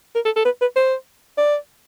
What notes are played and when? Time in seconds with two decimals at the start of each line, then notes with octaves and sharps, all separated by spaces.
0.15 A#4
0.25 A4
0.36 A4
0.45 B4
0.61 B4
0.76 C5
1.38 D5